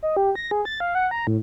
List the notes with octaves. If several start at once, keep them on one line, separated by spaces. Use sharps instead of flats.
D#5
G4
A#6
G#4
A6
F5
F#5
A#5
A2